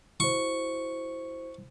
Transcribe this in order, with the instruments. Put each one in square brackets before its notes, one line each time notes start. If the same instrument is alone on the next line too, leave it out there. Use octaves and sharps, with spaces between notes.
[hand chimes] E4 F#4 C5 [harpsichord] C#6